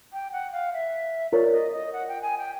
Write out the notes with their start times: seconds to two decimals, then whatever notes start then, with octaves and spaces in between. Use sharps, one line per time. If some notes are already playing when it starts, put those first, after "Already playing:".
0.13 G5
0.32 F#5
0.52 F5
0.73 E5
1.32 F4 A#4 C#5 D5
1.52 D#5
1.72 D#5
1.93 F#5
2.08 G5
2.22 G#5
2.38 G5